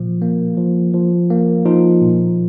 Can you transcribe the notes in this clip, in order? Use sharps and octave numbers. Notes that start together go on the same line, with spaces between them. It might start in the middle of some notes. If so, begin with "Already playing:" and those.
Already playing: A#2 F3
A#3
F3
F3
A#3
F3 D#4 F4
A#2